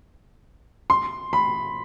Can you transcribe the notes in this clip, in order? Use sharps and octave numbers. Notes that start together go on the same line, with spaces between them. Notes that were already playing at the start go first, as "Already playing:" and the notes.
C6
B5